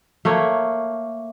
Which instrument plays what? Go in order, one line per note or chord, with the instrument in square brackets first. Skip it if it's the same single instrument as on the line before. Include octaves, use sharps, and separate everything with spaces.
[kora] A3 A#3 C#5